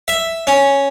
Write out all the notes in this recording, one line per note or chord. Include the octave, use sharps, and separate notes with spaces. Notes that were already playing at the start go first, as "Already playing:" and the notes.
E5
C#4